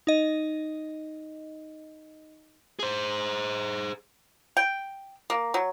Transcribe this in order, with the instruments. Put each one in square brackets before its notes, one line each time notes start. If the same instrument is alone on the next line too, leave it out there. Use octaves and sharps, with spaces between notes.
[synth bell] D#4 D#5
[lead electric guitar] G#4 C5
[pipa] G5
A#3
F#3